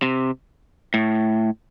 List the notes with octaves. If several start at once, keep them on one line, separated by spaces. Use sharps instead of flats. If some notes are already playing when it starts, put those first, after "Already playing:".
C3
A2